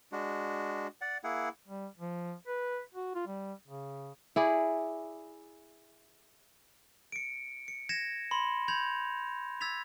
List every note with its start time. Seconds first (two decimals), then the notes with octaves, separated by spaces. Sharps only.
0.12 G#3 D4 F#4
1.01 D5 F#5
1.24 A#3 E4 G#4 F#5
1.68 G3
1.98 F3
2.47 B4
2.94 F#4
3.15 F4
3.27 G3
3.68 C#3
4.36 E4 G#4 D5
7.12 C#7 D7
7.68 C#7
7.89 G#6 A#6 C#7 E7
8.31 B5 C6
8.68 B5 G6 G#6 F7
9.61 E6 G#6 A6 B6 F7